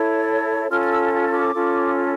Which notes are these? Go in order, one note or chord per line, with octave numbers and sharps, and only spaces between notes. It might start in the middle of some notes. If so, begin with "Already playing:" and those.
Already playing: E4 A4 C#5
C#4 F4 A4 F6
F6
E6
D6
C#4 F4 A4